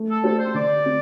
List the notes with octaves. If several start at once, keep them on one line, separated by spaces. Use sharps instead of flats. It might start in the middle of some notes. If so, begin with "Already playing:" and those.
Already playing: A3
A4
D4 G4 A4 C5
C5
D3 D5
C4